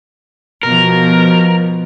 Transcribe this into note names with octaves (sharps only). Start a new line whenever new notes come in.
B2 F3 A#4